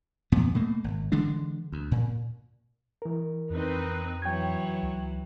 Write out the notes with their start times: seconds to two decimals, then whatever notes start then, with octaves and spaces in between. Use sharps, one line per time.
0.32 E2 A#2 B3
0.55 B2 A3 A#3
0.84 G#1
1.12 D3 E3 G#3 D4
1.72 D2
1.91 A#2
3.02 E3 A#4
3.50 F2 C4 D#4 B4
4.22 E3 F#3 C#5 G5 G#6
4.82 C#2